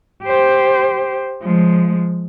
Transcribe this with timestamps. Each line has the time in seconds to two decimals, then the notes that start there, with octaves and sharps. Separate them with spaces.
0.24 G4 C5
1.42 F3 G#3